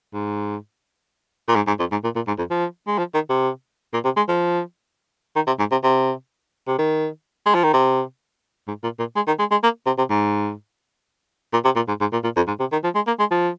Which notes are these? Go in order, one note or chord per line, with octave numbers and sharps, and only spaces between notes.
G#2
A#2
G#2
G#2
F2
G#2
A#2
A#2
G#2
F2
F3
G#3
F3
D#3
C3
A#2
C3
G#3
F3
D#3
C3
G#2
C3
C3
C3
D#3
G#3
F3
D#3
C3
G#2
A#2
A#2
G#3
D#3
G#3
G#3
A#3
C3
C3
G#2
A#2
C3
A#2
G#2
G#2
A#2
A#2
F2
G#2
C3
D#3
F3
G#3
A#3
G#3
F3